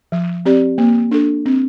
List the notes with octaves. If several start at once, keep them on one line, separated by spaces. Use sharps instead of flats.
F3
C4 G4 D5
A#3
D4 A4
C4